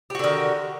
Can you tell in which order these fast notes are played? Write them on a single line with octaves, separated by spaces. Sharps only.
G4 F#4 D3 D#3